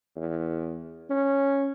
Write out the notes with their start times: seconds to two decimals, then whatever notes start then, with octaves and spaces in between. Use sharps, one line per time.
0.16 E2
1.10 C#4